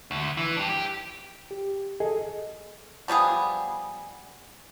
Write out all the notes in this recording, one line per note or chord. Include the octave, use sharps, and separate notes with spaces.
D2
E3
D4 G4
G4
G4
G#4 A4 D#5
F3 G3 B3 G#4